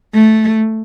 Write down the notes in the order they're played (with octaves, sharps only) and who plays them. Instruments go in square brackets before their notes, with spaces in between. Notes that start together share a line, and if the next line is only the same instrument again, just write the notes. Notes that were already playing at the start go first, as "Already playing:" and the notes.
[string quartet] A3